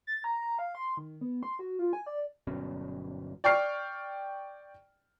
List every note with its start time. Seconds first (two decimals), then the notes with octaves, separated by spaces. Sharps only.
0.07 A6
0.24 A#5
0.59 F5
0.75 C6
0.97 D#3
1.21 B3
1.43 C6
1.59 F#4
1.79 F4
1.93 G#5
2.06 D5
2.47 G1 B2 F#3 C#4
3.44 D5 G5 C#6 F6 C7